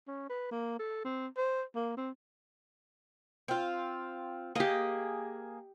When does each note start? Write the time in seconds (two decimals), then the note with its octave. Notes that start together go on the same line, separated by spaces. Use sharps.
0.07 C#4
0.29 B4
0.51 A#3
0.79 A4
1.04 C4
1.37 C5
1.75 A#3
1.97 C4
3.48 C4 F4
4.55 A#3 G4 G#4 D#5